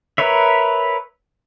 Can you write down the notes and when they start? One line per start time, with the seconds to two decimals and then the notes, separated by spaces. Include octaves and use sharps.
0.18 A#4 B4 C#5 E5